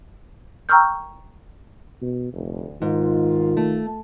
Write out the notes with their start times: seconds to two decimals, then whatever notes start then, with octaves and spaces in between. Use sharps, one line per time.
0.69 G5 A#5 C#6 E6 F6 G6
2.02 B2
2.33 F1 D2
2.82 G#2 D#3 F4
3.57 A3